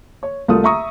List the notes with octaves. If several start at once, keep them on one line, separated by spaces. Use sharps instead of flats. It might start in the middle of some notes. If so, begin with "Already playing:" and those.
C#5
C2 A3 A#3 F4 D#6
E5 A#5 C#6 D#6